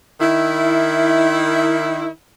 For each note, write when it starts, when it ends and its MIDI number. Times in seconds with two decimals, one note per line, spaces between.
0.21 2.08 51
0.21 2.08 64